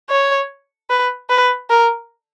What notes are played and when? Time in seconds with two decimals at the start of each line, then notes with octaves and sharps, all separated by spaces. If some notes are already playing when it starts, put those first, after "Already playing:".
0.10 C#5
0.90 B4
1.30 B4
1.70 A#4